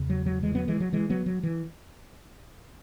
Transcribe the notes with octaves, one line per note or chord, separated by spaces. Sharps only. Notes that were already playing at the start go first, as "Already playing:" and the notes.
Already playing: E2 C#3
F#3
F#3
E3 G#3
F#3 B3
E3 G#3
F#3
E3 G#3
F#3 B3
F#3
E3